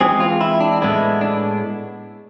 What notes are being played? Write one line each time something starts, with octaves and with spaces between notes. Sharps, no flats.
E3 G#3 C4 G#4
F4
E4
D4
A2 G#3 B3 D4 E4
D4